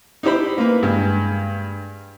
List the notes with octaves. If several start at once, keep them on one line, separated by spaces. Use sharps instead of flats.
D#4 E4 G4 C5 B5
A#3 B4
G2 G#3